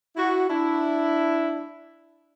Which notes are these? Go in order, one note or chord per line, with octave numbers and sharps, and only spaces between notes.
E4 F#4
D4 E4